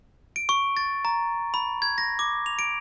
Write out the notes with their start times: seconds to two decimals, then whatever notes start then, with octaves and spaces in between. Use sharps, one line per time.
0.36 D7
0.49 C#6
0.77 A6
1.05 A#5
1.54 B5
1.82 G#6
1.98 A#6
2.19 D6
2.46 F7
2.59 D7